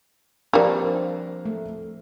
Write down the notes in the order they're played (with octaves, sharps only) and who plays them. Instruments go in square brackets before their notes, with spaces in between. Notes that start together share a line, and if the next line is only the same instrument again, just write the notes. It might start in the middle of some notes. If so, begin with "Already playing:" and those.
[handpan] F3 C4 [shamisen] G3 A#3 [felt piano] D4 A#4
[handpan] A3